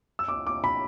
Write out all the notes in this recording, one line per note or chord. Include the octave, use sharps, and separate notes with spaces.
E6
D6
D6
B5